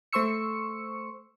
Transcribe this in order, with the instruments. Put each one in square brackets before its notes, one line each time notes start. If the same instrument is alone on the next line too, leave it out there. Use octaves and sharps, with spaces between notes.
[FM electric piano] A3 C5 C6 C#6 E6 C#7